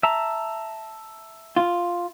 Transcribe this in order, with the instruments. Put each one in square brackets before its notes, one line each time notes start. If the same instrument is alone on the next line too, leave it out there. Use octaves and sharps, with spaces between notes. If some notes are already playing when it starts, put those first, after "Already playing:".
[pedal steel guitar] E5 A5 A#5
[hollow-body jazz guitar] F4